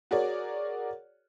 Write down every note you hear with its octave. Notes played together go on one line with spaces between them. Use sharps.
F#4 G#4 A#4 C#5 D5